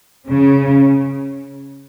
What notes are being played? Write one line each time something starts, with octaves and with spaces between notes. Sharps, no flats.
C#3